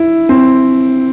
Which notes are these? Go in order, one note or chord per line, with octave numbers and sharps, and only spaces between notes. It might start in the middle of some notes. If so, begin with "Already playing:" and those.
Already playing: E4
C4